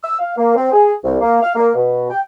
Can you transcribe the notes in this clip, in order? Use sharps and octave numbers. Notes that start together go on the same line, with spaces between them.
E6
F5
A#3
C4
G#4
C2
A#3
F5
A#3
B2
G5